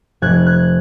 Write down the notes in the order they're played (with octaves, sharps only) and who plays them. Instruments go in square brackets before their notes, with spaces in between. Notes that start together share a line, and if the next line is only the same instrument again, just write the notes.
[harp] F1 F#6 G#6
F#6 G#6